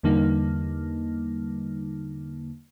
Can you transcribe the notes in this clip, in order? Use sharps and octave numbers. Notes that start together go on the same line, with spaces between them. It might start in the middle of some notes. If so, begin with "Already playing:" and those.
E2 D3 G3 A#3 D#4